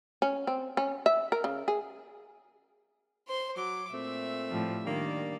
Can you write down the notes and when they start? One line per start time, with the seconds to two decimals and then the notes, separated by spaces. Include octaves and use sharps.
0.22 C#4
0.47 C4
0.77 C#4
1.06 E5
1.32 A#4
1.44 C#3
1.68 G#4
3.28 C5 C6
3.57 F#3 D6
3.91 A#2 A3 C4 E5
4.51 A2 F3 G3
4.85 D#3 G3 A#3 D4 D5